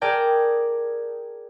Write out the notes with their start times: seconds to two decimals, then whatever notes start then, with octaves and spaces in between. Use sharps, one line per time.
0.01 G#4 A#4 D5 G5 A5